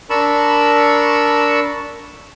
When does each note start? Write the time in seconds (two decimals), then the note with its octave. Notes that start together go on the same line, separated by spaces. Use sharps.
0.10 D4 A#4 A5 B5 C#6 E6